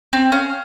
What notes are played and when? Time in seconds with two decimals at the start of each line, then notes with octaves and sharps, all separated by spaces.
0.13 C4
0.32 C#4 F5